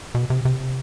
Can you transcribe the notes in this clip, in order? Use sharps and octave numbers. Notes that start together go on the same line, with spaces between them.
B2
C3
C3